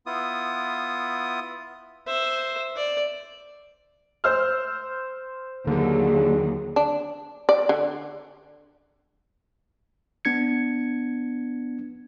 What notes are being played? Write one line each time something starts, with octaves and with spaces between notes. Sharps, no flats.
B3 E4 F4 D#6
C5 E5
D5
C5 E6 F6
D#2 D3 F#3 G#4
D4
D5
D3
B3 D4 G#6 C#7